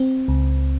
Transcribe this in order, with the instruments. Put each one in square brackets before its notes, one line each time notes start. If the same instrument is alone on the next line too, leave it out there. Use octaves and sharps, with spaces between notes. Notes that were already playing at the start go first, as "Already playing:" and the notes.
Already playing: [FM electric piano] C4
C#2